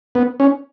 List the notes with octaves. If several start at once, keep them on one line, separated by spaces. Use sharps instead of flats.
B3
C#4